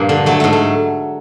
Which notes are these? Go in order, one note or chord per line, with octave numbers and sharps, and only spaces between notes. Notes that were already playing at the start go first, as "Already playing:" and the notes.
Already playing: G2 A#2 F3 A#3
D3
F#3 A3
G#2 A3
A3